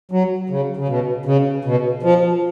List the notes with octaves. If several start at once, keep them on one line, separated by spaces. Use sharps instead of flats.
F#3
C#3
C#3
B2
C#3
B2
F3